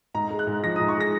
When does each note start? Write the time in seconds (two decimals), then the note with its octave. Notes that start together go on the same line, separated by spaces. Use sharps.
0.14 G#2 A#5
0.30 G#3
0.39 F#6
0.47 G#2
0.64 F3 A#6
0.76 G#2 D#6
0.88 C#6
0.96 G#3 A#6